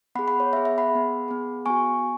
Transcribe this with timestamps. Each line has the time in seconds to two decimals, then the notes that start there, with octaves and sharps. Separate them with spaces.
0.15 B3 F#5 B5
0.19 G#4
0.28 F#5 B5
0.40 C#5
0.53 B3 E5
0.57 G#4
0.65 E5
0.78 F#5 B5
0.90 B3 G#4
1.28 B3 G#4
1.66 B3 F#4 G#5 C#6